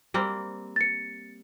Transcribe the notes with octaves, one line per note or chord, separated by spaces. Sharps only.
G3 A#3 C4
A6 C#7